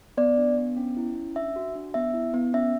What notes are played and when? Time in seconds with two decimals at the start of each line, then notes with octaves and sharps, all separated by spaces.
0.17 B3 D5
0.38 D4
0.57 B3
0.77 C#4
0.97 E4
1.16 C#4
1.35 D4 E5
1.56 F#4
1.75 D4
1.94 B3 E5
2.14 E4
2.34 B3
2.53 C#4 E5